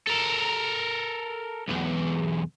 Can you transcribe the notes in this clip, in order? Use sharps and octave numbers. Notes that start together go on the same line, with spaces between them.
A4 A#4
B1 E2